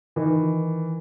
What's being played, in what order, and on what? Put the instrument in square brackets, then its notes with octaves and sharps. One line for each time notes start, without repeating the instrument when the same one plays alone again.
[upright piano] D#3 E3